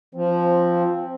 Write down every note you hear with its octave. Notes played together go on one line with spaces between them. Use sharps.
F3 C4